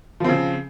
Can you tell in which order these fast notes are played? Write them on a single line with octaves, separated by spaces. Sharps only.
F3 C4 C#3